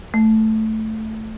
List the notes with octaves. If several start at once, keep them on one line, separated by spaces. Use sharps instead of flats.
A3